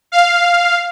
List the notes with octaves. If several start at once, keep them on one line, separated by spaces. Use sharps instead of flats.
F5